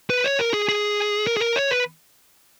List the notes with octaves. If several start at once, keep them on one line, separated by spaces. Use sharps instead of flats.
B4
C#5
A#4
G#4
G#4
A#4
G#4
A#4
C#5
B4